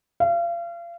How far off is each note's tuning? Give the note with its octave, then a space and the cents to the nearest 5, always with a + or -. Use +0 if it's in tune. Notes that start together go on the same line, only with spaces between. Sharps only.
F5 -35